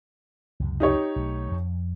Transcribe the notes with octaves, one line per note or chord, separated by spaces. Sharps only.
C#2 F#2 C3
D#4 G4 C#5
B1 A3
F2